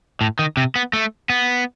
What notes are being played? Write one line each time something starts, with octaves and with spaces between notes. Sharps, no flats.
A2
D#3
C3
B3
A3
B3